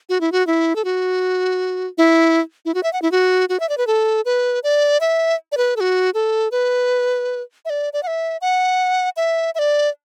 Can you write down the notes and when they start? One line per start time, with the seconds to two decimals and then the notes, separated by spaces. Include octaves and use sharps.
0.09 F#4
0.21 E4
0.32 F#4
0.47 E4
0.76 A4
0.85 F#4
1.98 E4
2.65 E4
2.74 F#4
2.83 E5
2.93 F#5
3.02 E4
3.12 F#4
3.49 F#4
3.60 E5
3.69 D5
3.78 B4
3.87 A4
4.25 B4
4.64 D5
5.01 E5
5.52 D5
5.57 B4
5.76 A4
5.80 F#4
6.14 A4
6.52 B4
7.65 E5
7.70 D5
7.93 D5
8.03 F#5
8.07 E5
8.41 F#5
9.17 E5
9.55 E5
9.59 D5